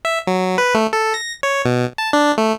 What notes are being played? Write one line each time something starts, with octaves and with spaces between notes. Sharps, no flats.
E5
F#3
B4
A3
A4
A#6
C#5
B2
A5
D4
A3